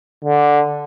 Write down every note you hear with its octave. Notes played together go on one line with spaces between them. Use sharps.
D3